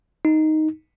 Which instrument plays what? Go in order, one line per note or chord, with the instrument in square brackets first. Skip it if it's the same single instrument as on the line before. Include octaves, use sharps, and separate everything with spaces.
[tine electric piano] D#4